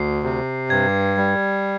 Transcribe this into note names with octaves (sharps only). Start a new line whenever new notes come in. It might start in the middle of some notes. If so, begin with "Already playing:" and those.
Already playing: D2 C7
C3
G2 G#6
G3